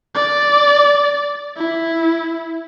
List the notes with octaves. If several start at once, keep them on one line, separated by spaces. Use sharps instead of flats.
D5
E4